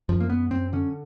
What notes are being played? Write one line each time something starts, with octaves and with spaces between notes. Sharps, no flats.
F#2 F3
A#3
F#2 B3
F#2 C4
D3 C#4